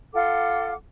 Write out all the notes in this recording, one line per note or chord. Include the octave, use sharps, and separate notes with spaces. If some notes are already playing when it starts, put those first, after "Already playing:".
F4 A4 F#5 D6